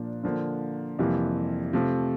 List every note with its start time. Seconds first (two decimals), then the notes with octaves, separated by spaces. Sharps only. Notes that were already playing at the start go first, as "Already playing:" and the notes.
Already playing: A#2 F3 A#3 D4
0.23 D3 F3 A#3
0.99 F2 C3 E3 G3 A#3
1.73 C3 F3 A3